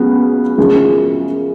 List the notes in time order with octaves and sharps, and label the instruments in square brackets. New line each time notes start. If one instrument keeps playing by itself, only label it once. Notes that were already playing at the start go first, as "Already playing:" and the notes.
Already playing: [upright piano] C#2 C#3 F#3 B3 F#4
F#2 C#3 F3 G#3